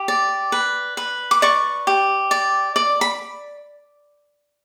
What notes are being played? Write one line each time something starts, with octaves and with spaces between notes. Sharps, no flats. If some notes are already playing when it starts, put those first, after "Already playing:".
Already playing: G4
D5
B4
B4
D6
D5 C#6
G4
D5
D5
B5